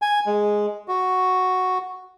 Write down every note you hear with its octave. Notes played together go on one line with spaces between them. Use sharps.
G#5
G#3
F#4